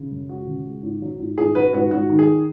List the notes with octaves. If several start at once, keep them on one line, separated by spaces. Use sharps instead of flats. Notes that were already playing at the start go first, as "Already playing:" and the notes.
Already playing: C#3
F#2
G#3 F#4
C#3
G#3
G#2
F#3
G#2
G#2 G#4
F#3 F#4 B4
G#2 F#4 B4
G#2 F#4
D#3
G#4